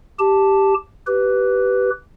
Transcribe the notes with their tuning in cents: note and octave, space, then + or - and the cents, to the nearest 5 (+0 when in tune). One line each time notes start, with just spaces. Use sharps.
G4 +0 A5 +0
G4 -20 B4 +0